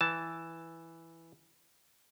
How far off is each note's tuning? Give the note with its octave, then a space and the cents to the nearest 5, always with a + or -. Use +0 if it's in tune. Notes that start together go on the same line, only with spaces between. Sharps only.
E3 +0 A5 +0